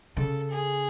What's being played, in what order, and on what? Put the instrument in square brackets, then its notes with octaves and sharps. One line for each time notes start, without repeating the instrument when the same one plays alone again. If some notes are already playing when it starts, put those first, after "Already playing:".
[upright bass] C#3 [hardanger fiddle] A4
[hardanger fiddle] G#4